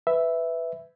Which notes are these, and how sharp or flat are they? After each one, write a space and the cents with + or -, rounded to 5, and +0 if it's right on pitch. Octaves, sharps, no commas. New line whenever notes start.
B4 +10 E5 +0